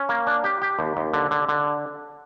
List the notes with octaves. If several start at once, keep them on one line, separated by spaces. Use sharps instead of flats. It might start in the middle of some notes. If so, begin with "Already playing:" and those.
Already playing: C#4
A#3
D4
G4
G4
D#2
D#2
D3
D3
D3